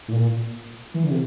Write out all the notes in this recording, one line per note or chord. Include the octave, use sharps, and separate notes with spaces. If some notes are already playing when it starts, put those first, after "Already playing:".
A2
A#2
E3
D3
C3